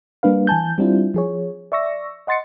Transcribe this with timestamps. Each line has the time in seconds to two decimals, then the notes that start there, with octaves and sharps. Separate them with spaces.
0.23 G3 A#3 D4 B4 F5
0.47 E3 G#5 A5 G6
0.78 G3 C4 D4 E4 F4
1.14 F3 G#4 C#5
1.72 D5 E5 C#6 E6 A#6
2.27 D#5 F#5 C6 A6 C7 C#7